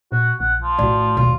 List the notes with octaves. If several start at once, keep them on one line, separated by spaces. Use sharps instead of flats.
A#2 F#4
A#1 F#5
F3
D#2 A2 F#4 D5
D#2 G#2 B2 F4